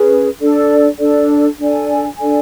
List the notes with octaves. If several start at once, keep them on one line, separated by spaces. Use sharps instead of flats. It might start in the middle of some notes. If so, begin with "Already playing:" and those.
Already playing: C#4 G#4 B4
D4 A4 D5
D4 A4 D5
D4 A4 D5 G#5
D4 A4 D5 G#5